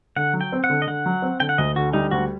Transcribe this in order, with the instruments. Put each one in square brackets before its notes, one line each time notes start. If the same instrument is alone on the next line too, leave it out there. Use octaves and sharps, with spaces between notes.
[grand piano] D3 [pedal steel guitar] F#5
[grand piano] F#3
[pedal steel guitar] G5
[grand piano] C4
[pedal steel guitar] F#5
[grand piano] D3
[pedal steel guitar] D#5
[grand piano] D3 [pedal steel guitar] F#5
[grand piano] F#3
C4
[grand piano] D3 [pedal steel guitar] G5
[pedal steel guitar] F#5
[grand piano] D2 [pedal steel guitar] D#5
[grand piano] D3 [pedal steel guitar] F#4
[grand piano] G3 [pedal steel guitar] D#4
[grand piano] D2 [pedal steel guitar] F#4